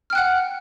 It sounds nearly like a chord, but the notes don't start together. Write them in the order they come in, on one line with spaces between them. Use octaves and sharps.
F6 G5 F#6 F#5